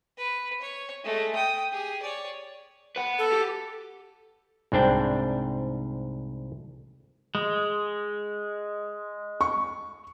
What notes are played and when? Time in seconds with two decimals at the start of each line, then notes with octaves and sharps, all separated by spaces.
0.18 B4
0.62 C#5
1.04 G#3 A3
1.35 G5 D#6
1.72 G4 G#4
2.02 C#5 D5
2.96 B4 F#5
3.19 A4
3.32 G4
4.72 C2 G#2 C4 D4 G5
7.35 G#3
9.41 C#6